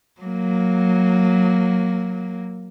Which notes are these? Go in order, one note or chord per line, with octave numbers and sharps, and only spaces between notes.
F#3 A#3